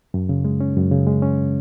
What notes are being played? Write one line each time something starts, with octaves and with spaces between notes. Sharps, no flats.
F#2
C#3
G#3
C#4
F#2
C#3
G#3
C#4